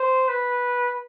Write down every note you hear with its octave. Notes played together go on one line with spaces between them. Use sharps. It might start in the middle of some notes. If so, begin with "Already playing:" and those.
Already playing: C5
B4